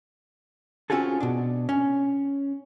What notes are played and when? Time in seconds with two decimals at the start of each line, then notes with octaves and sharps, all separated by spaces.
0.90 C4 C#4 F4 F#4 G#4 A4
1.20 B2 D4
1.69 C#4